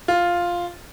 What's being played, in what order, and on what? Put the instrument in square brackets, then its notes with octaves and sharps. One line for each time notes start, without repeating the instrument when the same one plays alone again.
[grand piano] F4